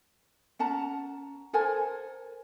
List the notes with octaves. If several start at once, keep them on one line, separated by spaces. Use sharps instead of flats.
C#4 F#5 A5 A#5
A4 A#4 C5 G#5